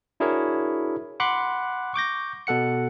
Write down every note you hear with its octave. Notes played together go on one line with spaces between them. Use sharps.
D4 E4 F#4 G#4 A#4 C#5
F#5 B5 C6 D6 F#6
C#6 D6 G6 A#6
B2 A4 F#5 C#7